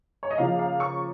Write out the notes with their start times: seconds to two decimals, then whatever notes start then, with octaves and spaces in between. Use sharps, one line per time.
0.23 C#5
0.31 D#5
0.38 C#3 F3 A#3 F5
0.59 F5
0.80 C#6